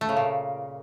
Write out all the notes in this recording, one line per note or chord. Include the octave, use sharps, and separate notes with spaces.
A3
C#3
A#2